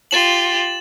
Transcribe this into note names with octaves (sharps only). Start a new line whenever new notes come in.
F4 G4 A6 E7 F#7